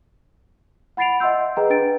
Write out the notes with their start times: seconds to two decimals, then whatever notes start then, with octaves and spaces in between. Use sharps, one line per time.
0.97 F#5 B5 A6 C7 D7 F7
1.20 D#5 E5 F#5 C6 E6 G6
1.57 G#4 B4 D#5 G5 A#5
1.70 D4 B4 G5 A6 D7